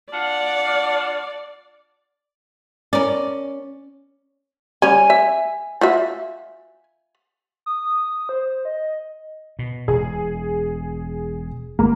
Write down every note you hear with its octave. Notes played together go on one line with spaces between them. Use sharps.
D4 F4 D5 F#5
C#4 A#4 D5
G3 C#4 G#5
E5
F4 F#4 E5
D#6
C5
D#5
B2
E1 G#4
G1 A#3